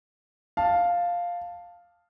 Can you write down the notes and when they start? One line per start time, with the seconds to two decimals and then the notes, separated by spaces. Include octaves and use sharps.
0.57 F5 A5